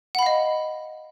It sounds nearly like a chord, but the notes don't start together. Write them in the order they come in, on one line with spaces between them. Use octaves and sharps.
F#5 B5 F5 D#5